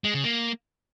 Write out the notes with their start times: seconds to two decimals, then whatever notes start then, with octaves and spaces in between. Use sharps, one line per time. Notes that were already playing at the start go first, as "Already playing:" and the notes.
0.04 G#3
0.14 C#3
0.24 A#3